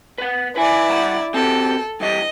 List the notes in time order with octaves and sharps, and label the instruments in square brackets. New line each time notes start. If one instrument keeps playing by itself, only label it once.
[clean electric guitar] B4 F#5
[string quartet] E4 D5 [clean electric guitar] B4 G#5
[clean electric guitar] G2 F#5 A#5
[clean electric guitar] C4 F#4 G4 [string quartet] A4
[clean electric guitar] G2 E3 G3 [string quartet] D#5